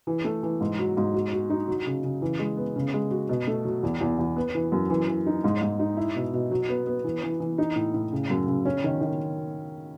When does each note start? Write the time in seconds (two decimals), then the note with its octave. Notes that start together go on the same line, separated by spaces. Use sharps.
0.07 E3
0.25 A3
0.43 E3
0.61 G#2
0.79 F#3
0.97 G#2
1.14 F#4
1.33 F#4
1.50 D#4
1.68 F#3
1.86 C#3
2.04 C#3
2.22 E3
2.39 G#3
2.57 B3
2.76 C#3
2.94 G#3
3.11 F#4
3.29 B2
3.47 A3
3.65 F#3
3.83 E2
4.01 E2
4.19 E2
4.36 B3
4.55 E3
4.72 F#2
4.90 E3
5.08 E3
5.26 D#4
5.44 G#2
5.61 G#2
5.79 D#4
5.97 E4
6.15 B2
6.33 B2
6.51 F#3
6.69 B3
6.87 B3
7.04 E3
7.23 E3
7.40 E3
7.58 D#4
7.76 A2
7.94 A2
8.12 C#3
8.30 F#2
8.48 C#3
8.65 C#4
8.84 D#3
9.01 D#3